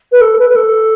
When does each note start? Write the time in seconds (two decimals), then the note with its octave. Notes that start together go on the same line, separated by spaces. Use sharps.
0.12 B4
0.21 A4
0.39 B4
0.50 B4
0.56 A4